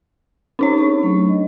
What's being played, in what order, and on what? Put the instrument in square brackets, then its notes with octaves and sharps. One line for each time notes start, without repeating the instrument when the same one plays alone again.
[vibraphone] C4 G4 [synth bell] C#4 D#4 C#5
[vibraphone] D4 G#4 C#6
F#3 A3 D4
D#5